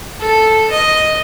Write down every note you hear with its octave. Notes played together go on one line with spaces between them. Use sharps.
A4
D#5